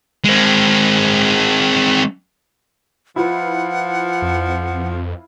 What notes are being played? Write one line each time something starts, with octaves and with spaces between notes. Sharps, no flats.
G#3 C4
F3 E4 F4 B4 F#5
F2